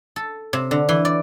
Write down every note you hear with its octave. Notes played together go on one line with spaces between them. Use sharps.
A4
C3
D3
E3
D5